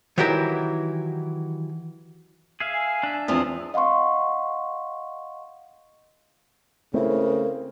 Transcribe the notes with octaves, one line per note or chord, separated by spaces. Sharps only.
D#3 E3 F#3 E4 G4 A#4
G#4 E5 F5
G#5
D4 E5
E2 F3 C4 D#6
D#5 F5 F#5 C6 C#6
C#3 A3 C4 E4 A#4